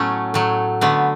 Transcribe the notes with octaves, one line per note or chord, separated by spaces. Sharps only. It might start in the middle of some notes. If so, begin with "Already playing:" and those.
Already playing: A2 F#3 A3 B3 C#4
A2 F#3 A3
D3 A3 B3